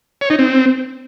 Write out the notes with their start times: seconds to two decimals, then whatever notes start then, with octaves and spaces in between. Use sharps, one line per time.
0.21 C#5
0.30 D#4
0.39 C4